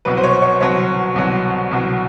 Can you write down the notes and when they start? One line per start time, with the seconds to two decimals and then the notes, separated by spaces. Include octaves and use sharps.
0.05 C2 B2 F#3 B4
0.17 C5
0.23 C#5
0.42 C#5
0.60 C2 B2 F#3 C#5
1.16 C2 B2 F#3
1.71 C2 B2 F#3